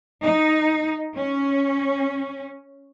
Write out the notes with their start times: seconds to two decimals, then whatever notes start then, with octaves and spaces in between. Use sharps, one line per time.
0.24 D#4
1.17 C#4